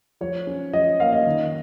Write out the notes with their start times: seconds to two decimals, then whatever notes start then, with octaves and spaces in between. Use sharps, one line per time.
0.21 F3 C#5
0.47 C#4
0.73 F3 D#5
1.00 A#3 F5
1.13 D#5
1.26 D#3